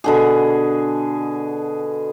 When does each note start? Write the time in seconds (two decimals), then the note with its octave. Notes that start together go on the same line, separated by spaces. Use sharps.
0.04 B2 D3 G#4